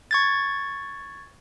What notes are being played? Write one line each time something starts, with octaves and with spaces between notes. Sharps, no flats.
C#6 G#6 A6